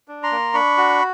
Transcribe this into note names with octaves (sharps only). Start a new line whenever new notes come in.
D4
A#5 C6
A#3
D4 B5 C#6
F#4